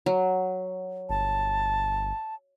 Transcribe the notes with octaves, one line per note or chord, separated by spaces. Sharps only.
F#3
G1 A5